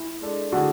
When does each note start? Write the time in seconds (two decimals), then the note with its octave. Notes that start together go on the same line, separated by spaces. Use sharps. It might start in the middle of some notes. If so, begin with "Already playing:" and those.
Already playing: E4
0.21 G#3 D4 A4
0.52 D3 A3 E4 F#4 G#4